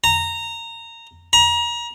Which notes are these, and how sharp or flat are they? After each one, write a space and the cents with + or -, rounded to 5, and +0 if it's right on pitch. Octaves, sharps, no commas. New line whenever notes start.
A#5 -15
A#5 +30